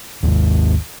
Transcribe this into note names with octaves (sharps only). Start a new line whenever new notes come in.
G#1 D#2